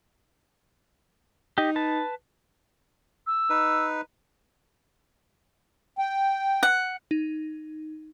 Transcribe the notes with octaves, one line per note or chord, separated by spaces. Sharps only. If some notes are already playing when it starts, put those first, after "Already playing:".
D#4 G4 D#5
B4 A5
E6
D#4 B4
G5
F#5
D#4